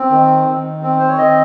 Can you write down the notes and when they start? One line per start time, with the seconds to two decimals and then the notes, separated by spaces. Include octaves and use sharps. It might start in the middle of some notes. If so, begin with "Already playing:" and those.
Already playing: C4
0.10 D#3
0.47 D#3
0.82 C4
0.99 C5
1.08 C#5
1.18 D#3 D#5